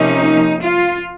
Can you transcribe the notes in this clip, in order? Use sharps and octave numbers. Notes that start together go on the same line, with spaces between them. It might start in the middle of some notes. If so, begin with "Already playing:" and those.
Already playing: C3 F3 A#3 C#4 D#4
F4